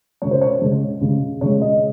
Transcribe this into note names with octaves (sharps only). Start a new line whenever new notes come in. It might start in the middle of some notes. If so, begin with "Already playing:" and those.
C#3 G#3 C#5
C5
C#5
C#3 G#3
C#3 G#3
C#3 G#3 C#5
D#5